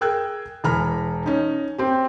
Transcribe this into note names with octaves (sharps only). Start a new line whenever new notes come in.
G#4 A#4 G5 E6 F#6 G#6
E1 E3 A#5 B5 F6
C#4 D#4
C4 G4